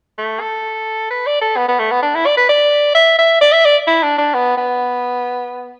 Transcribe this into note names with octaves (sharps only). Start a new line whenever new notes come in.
A3
A4
B4
D5
A4
B3
B3
A3
B3
D4
E4
D5
B4
D5
E5
E5
D5
E5
D5
E4
D4
D4
B3
B3